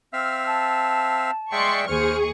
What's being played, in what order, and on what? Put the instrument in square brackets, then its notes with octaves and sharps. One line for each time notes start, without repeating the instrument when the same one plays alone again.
[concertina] C4 E5 F5 [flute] F6
[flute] A5
[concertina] G#3 E5 G5 [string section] D5 C6 C#6
[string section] D#2 G#4 C#6 [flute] C5 [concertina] F6